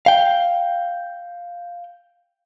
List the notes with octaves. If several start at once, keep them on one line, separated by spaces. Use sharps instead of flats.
F5 G5